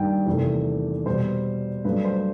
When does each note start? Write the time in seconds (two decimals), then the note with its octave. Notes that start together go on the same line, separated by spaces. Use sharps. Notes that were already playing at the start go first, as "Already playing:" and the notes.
Already playing: G2 D#3 G3 G5
0.27 E2 C3 D#3 A3
1.06 B2 G3 C5
1.84 G2 F#3 A3 B4
2.05 C5